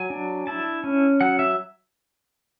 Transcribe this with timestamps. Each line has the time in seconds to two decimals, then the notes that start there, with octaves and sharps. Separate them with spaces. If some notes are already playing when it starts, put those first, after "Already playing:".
Already playing: F#3 G#5
0.10 D4
0.47 E4 A5
0.84 C#4
1.21 F#3 F#5
1.39 E5